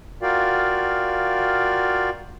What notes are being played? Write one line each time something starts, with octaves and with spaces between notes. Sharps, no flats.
F4 F#4 A#4 D5 F5 G5